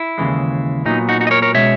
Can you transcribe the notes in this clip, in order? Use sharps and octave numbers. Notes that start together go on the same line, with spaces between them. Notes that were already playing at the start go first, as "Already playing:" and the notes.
Already playing: E4
D#2 C#3 E3 G#3
A#2 F#3 B3 D#4
D#4 F#4
D#4 F#4
D#5
A#4 C#5
A#4 C#5
B2 G#3 C#4 C#5 E5